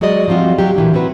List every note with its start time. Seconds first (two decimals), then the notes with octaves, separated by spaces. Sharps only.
0.01 F#3 G#3 F#4 G#4 D5 D#5
0.28 F3 G3 C4 F4 F#4
0.58 F#3 G4
0.76 A#2 E3 D4
0.93 F#3 C4 F#4 B4